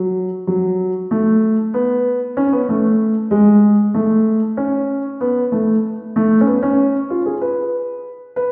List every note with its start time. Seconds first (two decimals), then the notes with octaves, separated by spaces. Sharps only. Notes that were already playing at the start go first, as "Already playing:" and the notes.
Already playing: F#3
0.47 F#3
1.11 A3
1.74 B3
2.37 C#4
2.52 B3
2.69 A3
3.31 G#3
3.94 A3
4.57 C#4
5.21 B3
5.52 A3
6.16 A3
6.41 C#4
6.46 B3
6.63 C#4
7.10 F4
7.26 G#4
7.41 B4
8.36 B4